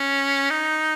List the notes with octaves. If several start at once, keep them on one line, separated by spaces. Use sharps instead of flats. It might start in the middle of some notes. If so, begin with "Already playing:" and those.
Already playing: C#4
D#4